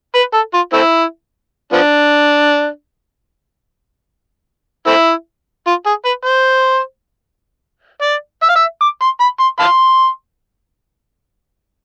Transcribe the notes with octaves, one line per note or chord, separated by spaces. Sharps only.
B4
A4
F4
A3 C4 E4
F3 B3 D4
A3 C4 E4
F4
G#4
B4
C5
D5
E5
F5
E5
D6
C6
B5
C6
F5 A5 C6